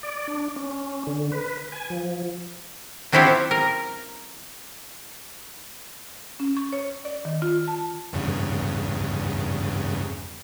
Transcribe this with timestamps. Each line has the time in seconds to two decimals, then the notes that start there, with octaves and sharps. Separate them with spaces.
0.03 D5
0.27 D4
0.56 C#4
1.07 D3
1.32 B4
1.72 G#5
1.90 F3
3.12 F#3 C4 C#4 E4 F4 G4
3.51 A#4
6.40 C#4
6.57 C#6
6.73 C#5
7.05 D5
7.25 D#3
7.42 F4
7.68 A5
8.13 E2 G2 C#3